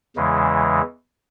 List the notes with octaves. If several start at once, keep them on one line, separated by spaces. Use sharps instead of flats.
E2 C#3 E3 G#3